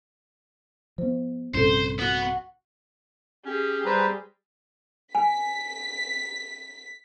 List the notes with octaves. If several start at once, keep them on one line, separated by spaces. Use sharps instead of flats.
F3 B3 C5
A#1 G2 C3 C#4 E4 A4 C5
B3 F#4 F#5 D#6
C#4 G4 G#4
G3 B4 C5 A#5
G#5 B6